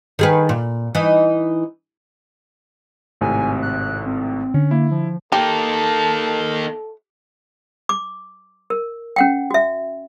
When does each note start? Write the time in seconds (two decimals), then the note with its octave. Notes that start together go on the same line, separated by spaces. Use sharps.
0.19 D#3 G#4 B4
0.49 A#2
0.95 E3 D#4
3.21 G#1 A2 C3 G#5
3.62 F#6
4.06 C4
4.54 D3 C#4
4.71 A#3 E4
4.91 F3
5.32 A#3 D#4 G4 A4 A5
7.89 D6
8.70 A#4
9.16 C#4 F#5 G5
9.51 F#4 E5